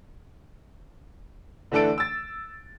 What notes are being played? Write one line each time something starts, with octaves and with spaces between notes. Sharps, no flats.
D3 E3 A3 D4 A4 D7
E6 A6